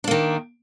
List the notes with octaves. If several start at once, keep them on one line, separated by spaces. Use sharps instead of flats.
D#3 A#3 D4